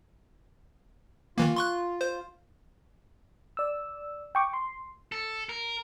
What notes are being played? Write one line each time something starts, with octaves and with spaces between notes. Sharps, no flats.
D#3 E3 A#3 F4
C6 C#6 F#6
C5
D5 E6
G5 C#6 D6
C6
A4
A#4